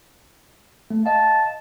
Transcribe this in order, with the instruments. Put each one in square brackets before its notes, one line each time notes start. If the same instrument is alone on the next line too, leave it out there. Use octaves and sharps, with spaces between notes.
[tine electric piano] A3
[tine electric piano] D#5 F5 [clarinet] A5